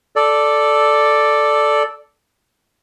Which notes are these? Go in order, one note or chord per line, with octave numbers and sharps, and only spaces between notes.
A4 D5